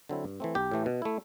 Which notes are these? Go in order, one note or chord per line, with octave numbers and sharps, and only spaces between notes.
D3 F#3 C4 E4
G2
E3 A3 C4
B1 G4
A2 E3 A3
B2
A3 E4